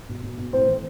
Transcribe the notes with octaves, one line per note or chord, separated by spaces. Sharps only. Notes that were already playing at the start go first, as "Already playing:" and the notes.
B2
B2
B2
A2 C4 C5
E3